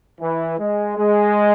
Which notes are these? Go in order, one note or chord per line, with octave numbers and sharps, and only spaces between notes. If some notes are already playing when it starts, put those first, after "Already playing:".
E3
G#3
G#3